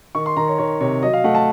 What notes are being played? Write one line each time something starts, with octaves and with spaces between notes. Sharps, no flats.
D#3 C#6
C6
D#3 A#5
C#5
D#3 C#5
C3 C#5
F#3 D#5
F5
A3 F#5
A5